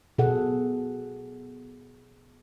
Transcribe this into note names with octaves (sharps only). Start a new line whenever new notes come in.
B2 G#4 A4 F#5